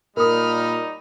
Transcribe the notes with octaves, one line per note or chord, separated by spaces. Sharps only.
A#2 G3 D#4 A#4 B5 D#6 F6